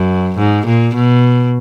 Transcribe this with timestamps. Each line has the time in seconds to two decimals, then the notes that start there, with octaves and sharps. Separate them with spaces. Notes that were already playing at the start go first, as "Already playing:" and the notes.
Already playing: F#2
0.38 G#2
0.66 A#2
0.95 B2